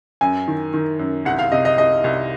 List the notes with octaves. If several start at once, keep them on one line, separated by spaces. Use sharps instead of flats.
F#2 G#5
D#3
D#3
F#2
C2 F#5
F5
C3 D#5
D#5
C2 D#5
C2